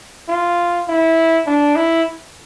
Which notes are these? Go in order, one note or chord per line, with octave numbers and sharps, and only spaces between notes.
F4
E4
D4
E4